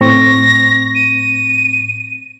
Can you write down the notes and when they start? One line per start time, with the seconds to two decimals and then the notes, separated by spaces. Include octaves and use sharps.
0.01 A2 C4 C#6 A#6
0.95 D#7